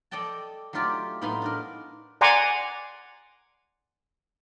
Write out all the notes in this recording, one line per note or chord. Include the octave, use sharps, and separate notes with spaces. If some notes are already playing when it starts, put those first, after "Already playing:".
A4 D5 D#5 G5 A5
F#3 A3 D#4 F4 G4 D5
A2 B3 D#4 F5 B5 C6
D4 D#4 A#4
D5 F#5 G#5 A#5 C6 D6